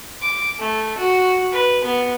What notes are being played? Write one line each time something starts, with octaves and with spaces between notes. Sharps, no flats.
D6
A3
F#4
B4
B3